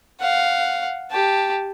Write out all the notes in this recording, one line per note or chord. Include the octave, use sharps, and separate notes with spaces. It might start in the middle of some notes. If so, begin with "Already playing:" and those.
F5 F#5
G4 A5